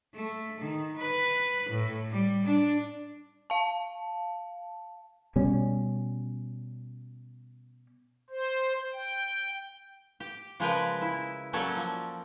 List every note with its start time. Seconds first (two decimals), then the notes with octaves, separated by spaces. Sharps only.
0.15 A3
0.61 D#3
0.97 B4
1.69 A2
2.11 G3
2.46 D4
3.50 F5 A5
5.36 B2 G3 C#4
8.30 C5
8.93 G5
10.20 G4
10.60 C#3 F3 G#3 A#4 B4 G5
11.02 E4
11.53 F#3 G3 A#3 C#4 A4 D5
11.76 F3